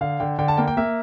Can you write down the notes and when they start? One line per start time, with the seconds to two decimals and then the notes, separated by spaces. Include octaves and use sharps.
0.01 D3 F5
0.20 D3 G5
0.39 D3 G5
0.48 A5
0.57 A#3 G5
0.68 G5
0.77 A#3 E5